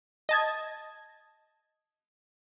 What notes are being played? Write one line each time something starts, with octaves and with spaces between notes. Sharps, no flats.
D#5 A5 G#6